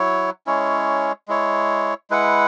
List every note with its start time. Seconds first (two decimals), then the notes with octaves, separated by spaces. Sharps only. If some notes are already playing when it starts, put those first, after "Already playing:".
Already playing: F#3 E4 C#5
0.46 G#3 C#4 E4 C#5
1.28 G#3 E4 C#5
2.10 G#3 E4 B4 F#5